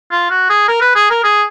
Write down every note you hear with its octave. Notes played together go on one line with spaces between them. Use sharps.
F4
F#4
G#4
A#4
B4
G#4
A#4
G#4